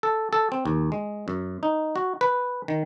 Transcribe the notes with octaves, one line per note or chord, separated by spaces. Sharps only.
A4
A4
C4
D#2
G#3
F#2
D#4
F#4
B4
D#3